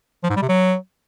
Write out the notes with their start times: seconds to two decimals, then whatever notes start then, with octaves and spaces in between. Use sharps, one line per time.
0.24 F3
0.30 G#2
0.36 G3
0.42 C3
0.49 F#3